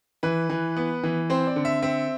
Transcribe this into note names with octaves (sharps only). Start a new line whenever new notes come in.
E3 B4
E3
B3
E3
C4 C5
D5
D3
E5
C4 E5